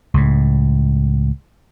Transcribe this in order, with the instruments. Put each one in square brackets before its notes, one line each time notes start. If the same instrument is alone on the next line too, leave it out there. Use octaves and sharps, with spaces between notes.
[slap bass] C#2 A2